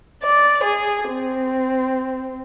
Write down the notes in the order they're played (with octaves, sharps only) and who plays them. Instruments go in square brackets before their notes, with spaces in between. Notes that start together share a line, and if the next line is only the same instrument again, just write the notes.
[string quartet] D5
G#4
C4